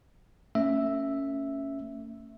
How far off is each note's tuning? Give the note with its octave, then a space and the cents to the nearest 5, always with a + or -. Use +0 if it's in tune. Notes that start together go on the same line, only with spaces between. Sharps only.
A3 +40 C#4 +0 E5 +0